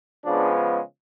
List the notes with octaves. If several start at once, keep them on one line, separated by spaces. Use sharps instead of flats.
C#3 F3 G#3 B3 D4